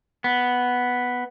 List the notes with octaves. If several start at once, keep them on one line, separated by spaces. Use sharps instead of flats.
B3